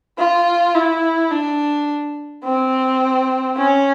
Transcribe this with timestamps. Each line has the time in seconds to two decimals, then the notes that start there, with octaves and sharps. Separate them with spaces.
0.18 F4
0.75 E4
1.31 D4
2.44 C4
3.57 C#4